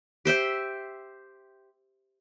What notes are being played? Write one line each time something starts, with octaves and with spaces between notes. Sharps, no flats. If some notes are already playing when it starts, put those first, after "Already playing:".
G4 C5 E5 G5